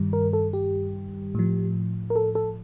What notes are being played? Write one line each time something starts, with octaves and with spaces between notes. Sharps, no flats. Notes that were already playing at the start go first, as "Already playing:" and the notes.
Already playing: G2 D#3 G3
A#4
A4
G4
A2 F3
A#4
A4
A4